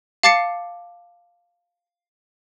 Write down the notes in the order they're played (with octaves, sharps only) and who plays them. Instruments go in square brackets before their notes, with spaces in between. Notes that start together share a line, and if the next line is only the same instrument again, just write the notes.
[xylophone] F5 A5 D6 A6 C7 C#7